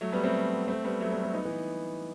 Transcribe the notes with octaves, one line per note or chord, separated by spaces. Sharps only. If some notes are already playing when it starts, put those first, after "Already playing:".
F#3 A3
G3 B3
A3 C4
A3 C4
G3 B3
F#3 A3
G3 B3
A3 C4
B3 D#4
E3